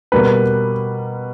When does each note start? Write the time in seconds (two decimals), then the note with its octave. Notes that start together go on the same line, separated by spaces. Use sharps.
0.12 B2 G3 A#3 B4